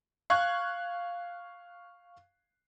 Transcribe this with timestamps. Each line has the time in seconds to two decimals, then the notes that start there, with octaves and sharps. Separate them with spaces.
0.30 F5 C#6 F#6 G#6